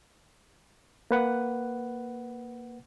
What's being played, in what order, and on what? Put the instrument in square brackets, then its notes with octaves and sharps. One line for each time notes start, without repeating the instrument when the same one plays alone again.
[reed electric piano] A#3 B4 F#5